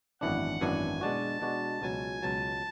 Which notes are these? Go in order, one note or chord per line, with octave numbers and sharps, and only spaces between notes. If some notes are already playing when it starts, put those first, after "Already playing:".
G#1 F#2 E3 B3 D4 F#5
G#1 F#2 E3 B3 D4 G#5
B2 G#3 D4 F#4 A5
B2 G#3 D4 F#4
C#2 B2 F#3 G#5
C#2 B2 F#3 A5